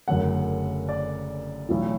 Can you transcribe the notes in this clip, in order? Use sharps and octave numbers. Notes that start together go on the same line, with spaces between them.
F#1 F#2 D3 A3 F#5
D5
B1 A2 E3